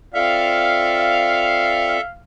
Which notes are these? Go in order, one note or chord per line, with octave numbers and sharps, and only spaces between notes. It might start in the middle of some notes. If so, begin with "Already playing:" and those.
C4 F4 A4 D5 E5 F5